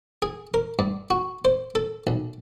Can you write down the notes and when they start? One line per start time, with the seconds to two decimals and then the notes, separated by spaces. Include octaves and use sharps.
0.22 G#4
0.54 A#4
0.79 G2
1.10 F#4
1.45 C5
1.75 A4
2.07 B1